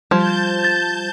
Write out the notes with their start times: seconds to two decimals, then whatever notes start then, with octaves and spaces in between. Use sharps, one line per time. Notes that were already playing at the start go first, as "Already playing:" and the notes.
0.11 F3 G3 C5 A5 G6 G#6
0.64 A6